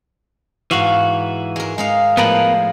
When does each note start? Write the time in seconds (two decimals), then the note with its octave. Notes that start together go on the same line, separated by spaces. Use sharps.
0.71 G#2 E3 F#4 F5
1.56 G#3 A#4
1.78 G#3 D#4 F5
2.17 A2 F3 G#3 B3 A#4 B4